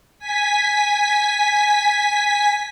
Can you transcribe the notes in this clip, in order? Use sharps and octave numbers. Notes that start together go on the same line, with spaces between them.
G#5 B6